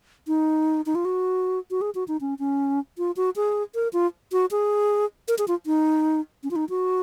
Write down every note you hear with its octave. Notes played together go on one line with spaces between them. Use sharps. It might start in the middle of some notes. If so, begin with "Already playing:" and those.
D#4
D#4
F4
F#4
F#4
G#4
F#4
D#4
C#4
C#4
F4
F#4
G#4
A#4
F4
F#4
G#4
A#4
G#4
F4
D#4
C#4
F4
D#4
F#4